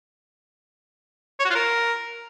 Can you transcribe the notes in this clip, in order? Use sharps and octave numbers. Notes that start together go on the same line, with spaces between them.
C#5
F#4
F4
A#4